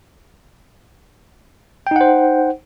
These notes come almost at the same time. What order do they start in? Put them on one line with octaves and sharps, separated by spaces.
G5 D#4 F#5 C5